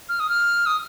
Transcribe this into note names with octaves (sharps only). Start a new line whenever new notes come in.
F6
D#6
F6
D#6